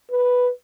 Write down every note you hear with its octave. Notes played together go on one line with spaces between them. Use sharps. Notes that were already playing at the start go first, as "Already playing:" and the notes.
B4